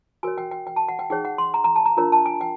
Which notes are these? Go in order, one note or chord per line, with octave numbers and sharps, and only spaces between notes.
F#4 A#4 C#5 G#5
G5
G5
G5
A5
F#5
G5
D#4 G#4 C#5 G5
F#5
C6
A#5
A#5
A5
A#5
D4 F4 A#4 C#5 A#5
A5
G#5
G5